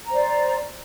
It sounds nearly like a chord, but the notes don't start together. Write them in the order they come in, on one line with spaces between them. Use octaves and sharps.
A#5 C5 D5